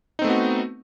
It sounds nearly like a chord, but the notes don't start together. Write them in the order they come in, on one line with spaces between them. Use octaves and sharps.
D#4 C4 A3 B3 F#4